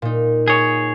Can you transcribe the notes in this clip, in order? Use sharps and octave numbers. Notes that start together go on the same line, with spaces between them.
A#2 D#4
G#4 C#5